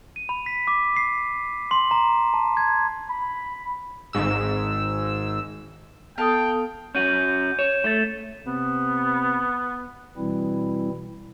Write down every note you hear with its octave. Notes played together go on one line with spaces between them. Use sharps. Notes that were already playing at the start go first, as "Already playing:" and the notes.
D#7
B5
B6
D6
C7
C6
A#5
A5
G#6
B5
G#1 G#2 E6
B3 A4 F5 G5 A5 D#6
C#4 F#4 G6 D#7
C#5 E7
A3 A6 E7
C3 B3
B2 E3 G3 C4 E4